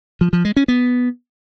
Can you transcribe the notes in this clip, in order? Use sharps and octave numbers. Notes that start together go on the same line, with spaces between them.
F3
F3
G#3
C#4
B3